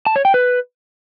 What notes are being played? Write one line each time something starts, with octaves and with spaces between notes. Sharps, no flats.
A5
C#5
G5
B4